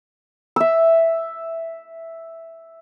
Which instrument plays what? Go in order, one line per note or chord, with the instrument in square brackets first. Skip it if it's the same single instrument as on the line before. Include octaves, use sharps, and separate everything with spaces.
[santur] E5 E6